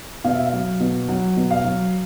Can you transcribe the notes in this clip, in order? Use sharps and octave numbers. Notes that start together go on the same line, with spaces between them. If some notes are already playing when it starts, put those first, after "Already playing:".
B2 F5
E5
F5
F#3
B2
F#3 F#5
B2
F5
F#3